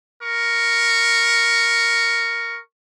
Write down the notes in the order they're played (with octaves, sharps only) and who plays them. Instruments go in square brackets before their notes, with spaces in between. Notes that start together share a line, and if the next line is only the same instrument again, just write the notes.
[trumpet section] A#4 C#6